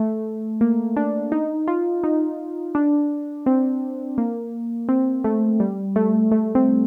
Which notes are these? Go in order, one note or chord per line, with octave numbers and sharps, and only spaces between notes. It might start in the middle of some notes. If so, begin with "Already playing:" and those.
Already playing: A3
A#3
D4
D#4
F4
D#4
D4
C4
A#3
C4
A3
G3
A3
A3
C4